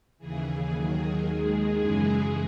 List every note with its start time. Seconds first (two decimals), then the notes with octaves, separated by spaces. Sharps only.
0.18 D#2 C#3 E3 G#4
0.71 D#2 D#3 F#3
1.25 D#2 D#3 G#3
1.78 F#2 C#3 E3 G#3 G#4